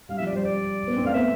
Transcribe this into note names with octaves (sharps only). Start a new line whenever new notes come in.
G3 F5
F3 E5
D5
G3 C5
D5
B3
C4
A3 F5
B3 E5